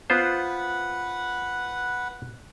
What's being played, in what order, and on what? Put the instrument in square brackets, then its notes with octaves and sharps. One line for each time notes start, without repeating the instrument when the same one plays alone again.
[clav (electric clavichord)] B3 F4 C5 [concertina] B4 F#5